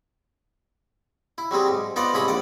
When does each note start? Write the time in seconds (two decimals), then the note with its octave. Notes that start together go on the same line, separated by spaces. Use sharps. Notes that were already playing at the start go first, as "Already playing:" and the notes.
1.38 E4
1.51 F#3 G3 C4 G#4
1.68 G#2
1.96 B3 D#4 F4 C5 D5 F#5
2.14 C2 G#2 E4 C#5 B5 D#6
2.28 A#1 D5 F#5